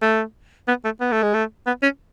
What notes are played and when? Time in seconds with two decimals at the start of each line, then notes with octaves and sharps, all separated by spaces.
0.02 A3
0.68 B3
0.85 A3
1.01 B3
1.12 A3
1.23 G#3
1.34 A3
1.67 B3
1.83 C#4